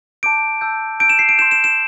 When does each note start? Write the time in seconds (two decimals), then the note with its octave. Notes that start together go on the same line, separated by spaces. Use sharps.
0.23 A5 D6 G6 D7
0.61 A5 E6 G6
1.00 A5 E6 G6 D7
1.10 E7
1.19 C7
1.29 D7
1.38 C6 G6 E7
1.51 E7
1.64 E7